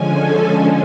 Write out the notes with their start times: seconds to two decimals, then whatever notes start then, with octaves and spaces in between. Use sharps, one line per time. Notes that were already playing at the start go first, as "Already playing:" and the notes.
Already playing: D3 F3 G#3 C#4 G#5
0.14 A4
0.49 D3 F3 G#3 C#4